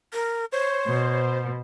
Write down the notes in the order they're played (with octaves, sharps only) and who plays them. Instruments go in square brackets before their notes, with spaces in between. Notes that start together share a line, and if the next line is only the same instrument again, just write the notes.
[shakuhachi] A#4
[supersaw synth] C5 [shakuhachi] C#5
[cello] B2